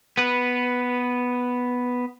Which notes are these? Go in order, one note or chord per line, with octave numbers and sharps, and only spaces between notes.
B3 B4